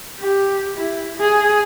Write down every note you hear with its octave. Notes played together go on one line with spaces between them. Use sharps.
G4
E4
G#4